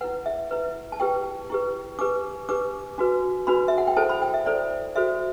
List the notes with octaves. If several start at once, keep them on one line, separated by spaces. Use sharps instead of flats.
E4 B4 F#5
E5
E4 B4
A5
E4 G4 B4 G5
E4 G4 B4
D4 G4 B4 D6
D4 G4 B4 D6
D4 F#4 B4
D4 F#4 B4 B5
E5
F#5
G5
E4 A4 C5 A5
B5
G5
E5
E4 A4 C5 D5
F#4 A4 C5 E5